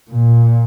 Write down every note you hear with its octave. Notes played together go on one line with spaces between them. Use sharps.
A#2